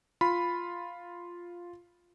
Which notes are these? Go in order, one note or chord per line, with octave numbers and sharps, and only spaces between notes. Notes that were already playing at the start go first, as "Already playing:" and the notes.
F4 B5